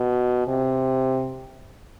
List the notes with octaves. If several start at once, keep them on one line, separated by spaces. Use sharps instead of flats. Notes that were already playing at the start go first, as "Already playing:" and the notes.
Already playing: B2
C3